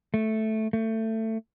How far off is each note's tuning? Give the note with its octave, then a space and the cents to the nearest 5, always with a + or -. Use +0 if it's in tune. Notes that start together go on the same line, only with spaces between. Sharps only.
A3 -5
A3 +20